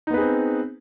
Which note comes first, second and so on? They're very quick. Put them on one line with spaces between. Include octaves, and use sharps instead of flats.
D#4 B3 B4 G#4 C4